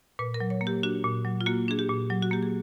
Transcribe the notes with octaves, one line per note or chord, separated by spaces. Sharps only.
A#2 B4
A#4
F#3
C#5
A#3
G4
D4 F#4
A#2
F#3
F4
A#3 F#4
D4 G#4
G4
A#2
F#3
F#4
A#3 G4
G#4